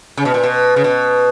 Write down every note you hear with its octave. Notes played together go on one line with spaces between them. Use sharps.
C#3
B2
A#2
B2
C#3
B2